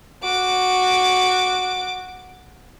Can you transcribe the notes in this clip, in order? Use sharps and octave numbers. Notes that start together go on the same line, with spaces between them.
F#4 D6